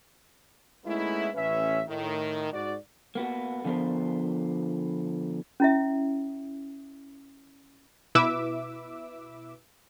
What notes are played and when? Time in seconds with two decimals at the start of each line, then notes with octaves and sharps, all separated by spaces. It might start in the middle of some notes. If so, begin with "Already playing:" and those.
0.85 G#3 A3 B3 C#4 D#4 E4
1.35 A1 C#4 B4 E5
1.87 A2 D#3
2.53 G#2 F#4 D5
3.15 A#3 B3 F#4
3.64 D3 F3 B3 G4 A#4 C5
5.60 C#4 E4 E5
8.15 B2 E4 B4 E5 D6 E6